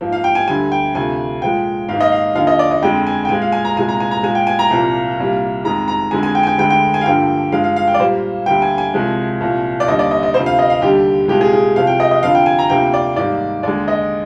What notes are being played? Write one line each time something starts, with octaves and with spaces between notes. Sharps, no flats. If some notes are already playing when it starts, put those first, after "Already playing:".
G#2 F3 A#3
F5
G5
G#5
D2 D3 G3 G#5
G5
D2 C3 F3 G#5
A#2 F3 G#3 G5
G#2 D#3 A#3 F5
D#5
F5
D#2 D3 F3 F5
D#5
D5
D#5
F2 D3 G#3 G5
G#5
G5
A#2 G#3 G#5
F5
G#5
A#5
C2 A#2 G#3 G#5
A#5
G#5
A#5
A#2 G#3 G#5
G5
G#5
A#5
C2 A#2 F3 A#3
C2 A#2 G3 A#3
F2 D#3 G#3 A#5
A#5
F2 D3 G#3 G#5
G#5
G5
G#5
G5
D2 D3 G#3 G5
G5
G#5
F5
G2 D3 F3 A#3 G5
G2 F3 G#3 F5
F5
F5
G5
D5
A#2 G3 A#3 C5
D2 D3 G3 A#3 G5
G#5
G#5
C2 C3 F3 G#3
C2 A#2 F3
D5
D#2 D3 G3 A#3 D#5
D5
D#5
D#5
D2 C3 F3 C5
F5
D#5
F5
D#2 D3 G3 G4
C2 A#2 G#3 G4
G#4
G#4
C2 C3 F3 F5
G5
D#5
D#5
F2 D3 F3 F5
G5
G#5
A#5
D2 C3 F3 A#3 G5
D5
G#2 D#3 G3 A#3 D5
D#2 D3 G#3 D5
D#5